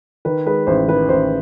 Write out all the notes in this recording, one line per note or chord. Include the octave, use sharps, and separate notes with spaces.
D#3 B4
G#3 B4
A1 C5
D#3 B4
A1 C5